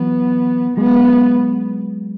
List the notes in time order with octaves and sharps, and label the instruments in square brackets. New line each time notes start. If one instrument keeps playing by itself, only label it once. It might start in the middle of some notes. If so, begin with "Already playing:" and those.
Already playing: [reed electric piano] E3 F#3 [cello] B3
[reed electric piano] F#3 G#3 [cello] B3